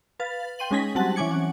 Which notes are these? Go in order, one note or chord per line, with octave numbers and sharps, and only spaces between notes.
B4 F5 A6
G5 C6 D#7 F#7
G#3 C#4 D#4 G#5 A#6 B6
F#3 G3 C4 F#5 A5 F#7
E3 C#4 G#5 D6 G#6 C#7
F#5